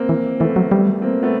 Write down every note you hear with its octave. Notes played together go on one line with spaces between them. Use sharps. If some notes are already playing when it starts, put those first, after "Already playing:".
Already playing: A#3 C4
E3
E3 A3 B3
F#3
G3
A#3 C4
A3 B3